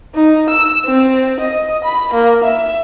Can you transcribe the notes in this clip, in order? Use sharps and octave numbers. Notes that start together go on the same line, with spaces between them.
D#4
E6
C4
D#5
B5
A#3
E5